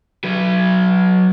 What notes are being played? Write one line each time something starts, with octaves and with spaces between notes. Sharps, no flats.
F#3 B4